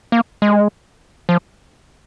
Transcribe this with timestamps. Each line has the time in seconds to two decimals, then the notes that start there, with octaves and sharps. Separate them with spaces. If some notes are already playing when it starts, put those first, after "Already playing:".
0.12 A#3
0.42 G#3
1.29 F3